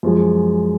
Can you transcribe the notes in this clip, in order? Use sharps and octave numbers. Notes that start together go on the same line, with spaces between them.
F#2 F3 G#3